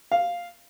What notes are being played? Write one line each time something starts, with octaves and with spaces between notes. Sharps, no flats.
F5